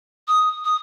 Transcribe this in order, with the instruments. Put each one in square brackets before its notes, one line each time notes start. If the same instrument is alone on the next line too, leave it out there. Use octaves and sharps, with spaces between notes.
[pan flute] D#6
D#6